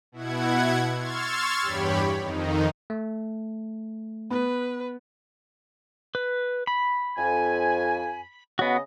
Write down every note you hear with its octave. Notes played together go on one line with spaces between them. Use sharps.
B2 E4 F#5 G#6
C6 C#6 E6 F6 G#6 A6
E2 G2 G4 C#5 B5
F2 D#3 D#4
A3
B3 B4
B4
B5
F2 G#5
C#3 B3 F#4 D#5